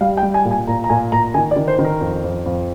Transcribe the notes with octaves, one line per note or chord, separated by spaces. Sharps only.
G3 F5
G5
G3
G#5
A#2
G#5
A#2 A#5
A#5
A#2 G#5
A#2 A#5
D#3 G#5
D5
D#3
C5
D#3
A#4
F2
F2
F2